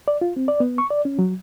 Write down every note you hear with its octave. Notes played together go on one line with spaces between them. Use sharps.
D5
F4
C4
D5
B3
C#6
D5
C#4
F#3